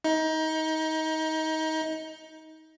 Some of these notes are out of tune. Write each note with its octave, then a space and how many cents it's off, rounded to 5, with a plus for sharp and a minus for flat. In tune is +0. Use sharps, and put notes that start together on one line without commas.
D#4 +25